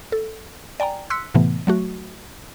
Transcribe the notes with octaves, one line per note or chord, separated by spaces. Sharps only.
A4
D5 G5 G#5 A#5
C6 E6 F#6 B6 C#7
A2 C3 E3 A3 B3
F#3 A3 F#4